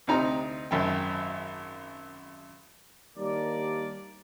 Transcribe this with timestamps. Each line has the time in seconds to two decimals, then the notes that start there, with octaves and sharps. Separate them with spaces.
0.07 D2 C3 D#4 A#5
0.71 G#1 F#2 G5
3.16 D#2 G3 D4 A#4 D5